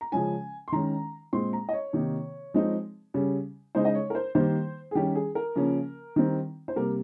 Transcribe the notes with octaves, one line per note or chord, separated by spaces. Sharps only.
A#5
C#3 F3 G#3 C#4 G#5
C6
D#3 G#3 C#4 A#5
A#2 G#3 C4 C6
A#5
D#5
C#5
C3 D#3 A#3 D#4
F3 G#3 C4 D#4
C#3 G3 C#4
C#3 G#3 D#4 C5
D#5
C#5
A#4
C5
D#3 G3 A#3 C5
G#4
D#3 G3 C#4 G4
G#4
A#4
C#3 F3 A#3 C#4
D#3 G3 C4
C5
C3 G3 A#3 A#4